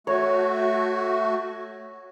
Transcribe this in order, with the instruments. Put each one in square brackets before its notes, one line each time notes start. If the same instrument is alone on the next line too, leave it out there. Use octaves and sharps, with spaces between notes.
[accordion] A3 F#4 [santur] C#5